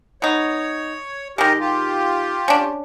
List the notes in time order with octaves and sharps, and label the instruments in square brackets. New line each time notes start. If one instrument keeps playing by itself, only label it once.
[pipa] B3 D#4 [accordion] C#5
[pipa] D#3 G#3 [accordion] G4 A#4 D#5
[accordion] F4 G4
[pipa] C#4 D4